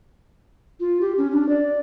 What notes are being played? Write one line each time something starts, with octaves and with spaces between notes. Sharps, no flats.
F4
G4
C#4
D4
D5